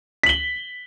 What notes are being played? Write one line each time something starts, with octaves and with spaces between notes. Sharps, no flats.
B6 F#7 G7